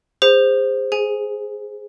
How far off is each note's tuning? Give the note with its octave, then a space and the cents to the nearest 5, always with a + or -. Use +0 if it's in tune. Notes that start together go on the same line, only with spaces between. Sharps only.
G#4 -35 C5 +0
G#4 +5 G#5 +0